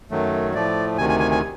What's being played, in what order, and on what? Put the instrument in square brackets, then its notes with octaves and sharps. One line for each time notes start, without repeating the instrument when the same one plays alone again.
[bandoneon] F#2 D#3 F#3 A3
A2 F3 A3 D5
D2 C3 D#3 G#5
G#5
G#5
G#5